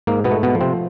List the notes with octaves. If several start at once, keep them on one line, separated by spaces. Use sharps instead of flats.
G#2 A#3
B2 B3
A3
B2 B3
F3
C3 C4